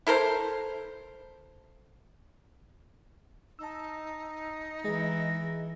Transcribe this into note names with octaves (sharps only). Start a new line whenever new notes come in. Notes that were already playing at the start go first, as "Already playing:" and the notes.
E4 A4 A#4 C5
D#4 A5 E6
E3 G#3 G#4 D#5 A#6